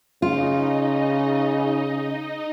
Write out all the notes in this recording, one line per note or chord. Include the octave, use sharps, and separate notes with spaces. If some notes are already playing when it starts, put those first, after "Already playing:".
C#3 D#4 F4 D#5